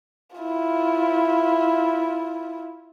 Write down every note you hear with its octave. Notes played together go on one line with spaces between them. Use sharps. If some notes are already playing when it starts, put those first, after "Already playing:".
E4 F4